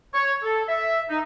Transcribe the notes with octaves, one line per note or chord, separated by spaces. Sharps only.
C#5
A4
E5
D#4